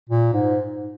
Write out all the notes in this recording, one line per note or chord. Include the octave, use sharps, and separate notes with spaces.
A#2
G#2